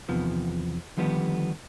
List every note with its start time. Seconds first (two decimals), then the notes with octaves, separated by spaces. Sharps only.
0.08 E2 C3 D#3 F3 B3
0.97 D3 D#3 F3 G3 B3 G4